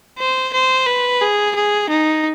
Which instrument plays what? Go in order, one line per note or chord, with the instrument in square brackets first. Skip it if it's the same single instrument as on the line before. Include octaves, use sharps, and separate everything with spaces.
[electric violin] C5
C5
B4
G#4
G#4
D#4